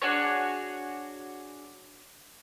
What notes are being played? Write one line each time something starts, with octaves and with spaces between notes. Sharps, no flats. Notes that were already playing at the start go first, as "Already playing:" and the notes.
D4 F#4 G#4 C#5